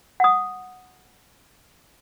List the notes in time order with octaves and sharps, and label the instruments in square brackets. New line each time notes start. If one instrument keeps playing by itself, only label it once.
[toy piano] F#5 D#6